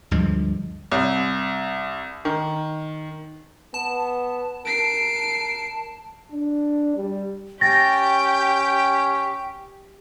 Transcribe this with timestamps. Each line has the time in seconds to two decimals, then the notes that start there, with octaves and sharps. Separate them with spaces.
0.11 D2 G2 F3 G#3
0.92 C2
2.25 D#3
3.74 B3 A5
4.65 A#4 C7 D7
6.32 D4
6.97 G3
7.61 C#4 G4 G5 A6 A#6